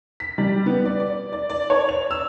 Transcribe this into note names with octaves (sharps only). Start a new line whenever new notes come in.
B6
G3
B3
D5
D5
D5
D5
C#5
F7
E6